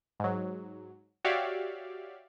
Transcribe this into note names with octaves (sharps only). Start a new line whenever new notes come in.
G#2 F#3
F#4 G4 C#5 D5 E5 F5